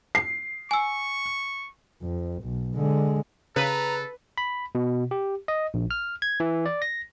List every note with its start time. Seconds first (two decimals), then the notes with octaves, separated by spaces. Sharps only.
0.15 C7
0.71 G#5 C#6 E6
2.02 F2
2.43 B1
2.75 D3 G#3
3.56 C#3 A4 B4 A#5
4.38 B5
4.75 B2
5.11 G4
5.48 D#5
5.74 A#1
5.91 F6
6.22 G#6
6.40 E3
6.66 D5
6.82 A#6